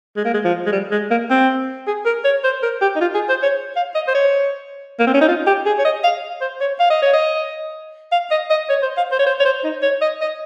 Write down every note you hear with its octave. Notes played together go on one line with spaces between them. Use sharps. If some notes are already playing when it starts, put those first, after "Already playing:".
G#3
A#3
G#3
F3
G#3
G3
G#3
A#3
C4
G#4
A#4
C#5
C5
A#4
G4
D#4
F4
G#4
C5
C#5
F5
D#5
C5
C#5
A#3
C4
C#4
D#4
F4
G4
G#4
C#5
D#5
F5
C5
C#5
F5
D#5
C#5
D#5
F5
D#5
D#5
C#5
C5
F5
C5
C#5
C5
C#5
C5
D#4
C#5
D#5
D#5